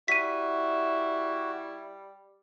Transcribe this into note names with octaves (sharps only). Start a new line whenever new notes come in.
G3 E4 F#4 B6 D#7